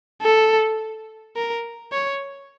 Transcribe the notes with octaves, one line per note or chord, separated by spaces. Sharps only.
A4
A#4
C#5